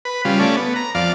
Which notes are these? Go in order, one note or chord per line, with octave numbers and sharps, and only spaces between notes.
B4
C#3 G3 F4
A3 C#4 D5
B3
A#5
F2 D5 F5